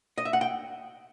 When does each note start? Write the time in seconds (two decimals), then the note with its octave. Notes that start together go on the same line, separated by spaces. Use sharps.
0.18 D#5
0.25 E5
0.33 F#5
0.41 G5